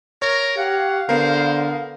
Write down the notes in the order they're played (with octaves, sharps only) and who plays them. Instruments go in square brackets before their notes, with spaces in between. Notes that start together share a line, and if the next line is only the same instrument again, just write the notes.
[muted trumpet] A#4 [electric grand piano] C#5
[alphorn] G4 [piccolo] F5 [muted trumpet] F#5
[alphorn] D3 [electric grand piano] B3 A#4 [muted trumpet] C5